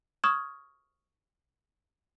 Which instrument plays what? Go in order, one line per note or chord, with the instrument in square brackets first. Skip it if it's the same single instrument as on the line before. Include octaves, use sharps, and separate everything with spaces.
[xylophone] C#6 D#6 F6 G#6 E7